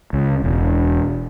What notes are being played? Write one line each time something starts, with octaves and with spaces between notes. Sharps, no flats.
C#2
E1